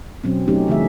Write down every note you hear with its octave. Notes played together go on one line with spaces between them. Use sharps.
B2 F#3 C4 C#4
F#3 A3 C#4 D#4 G4
C#3 E3 A3 G#4 E5